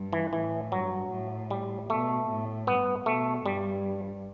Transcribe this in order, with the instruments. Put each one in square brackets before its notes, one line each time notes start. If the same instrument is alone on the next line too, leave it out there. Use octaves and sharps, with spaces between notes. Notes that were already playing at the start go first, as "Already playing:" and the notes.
Already playing: [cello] G2
[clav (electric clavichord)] E3
[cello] A2 [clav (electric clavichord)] E3
[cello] G2 [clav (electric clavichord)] F#3
[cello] A2
[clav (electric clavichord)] G3
[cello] B2 [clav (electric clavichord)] A3
[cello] A2
[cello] G2 [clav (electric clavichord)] B3
[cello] B2 [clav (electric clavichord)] A3
[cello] G2 [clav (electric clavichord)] G3